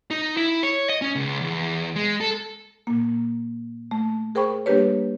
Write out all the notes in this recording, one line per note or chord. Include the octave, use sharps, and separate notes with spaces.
D#4
E4
C#5
D#5
C#4
C#2
E2
G#3
A4
A#2 A#3
A3
G#4 A#4 C5 G5 B5 C#6
G3 A#3 D4 G4 B4 C#5